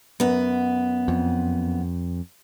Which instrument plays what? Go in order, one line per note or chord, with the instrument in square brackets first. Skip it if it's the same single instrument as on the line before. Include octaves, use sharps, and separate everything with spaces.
[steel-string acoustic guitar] F#2 B3
[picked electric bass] F2